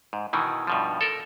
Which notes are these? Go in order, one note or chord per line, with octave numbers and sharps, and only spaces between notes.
G#2
B2 D#3 E3
G2 B2 F3
A4 A#4